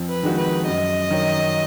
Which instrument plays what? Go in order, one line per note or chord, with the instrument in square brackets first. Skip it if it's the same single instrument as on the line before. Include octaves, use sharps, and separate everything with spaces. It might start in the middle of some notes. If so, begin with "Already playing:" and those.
Already playing: [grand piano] F2
[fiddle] B4
[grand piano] D#3 G#3 D#4 F#4
[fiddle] B4
[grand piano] F#2 [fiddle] D#5
[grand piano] D#3 F#3